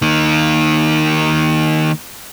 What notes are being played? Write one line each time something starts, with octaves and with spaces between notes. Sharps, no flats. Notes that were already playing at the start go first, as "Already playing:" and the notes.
D#3 A#3